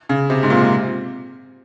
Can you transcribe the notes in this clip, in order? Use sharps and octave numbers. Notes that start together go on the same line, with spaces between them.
C#3
C3
G#2
A#2
C3